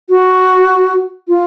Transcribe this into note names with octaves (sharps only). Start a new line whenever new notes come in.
F#4
F4